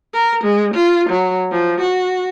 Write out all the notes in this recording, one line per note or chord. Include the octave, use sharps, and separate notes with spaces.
A#4
G#3
F4
F#3
F3
F#4